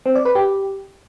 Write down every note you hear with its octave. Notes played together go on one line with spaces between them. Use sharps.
C4
D5
B4
G4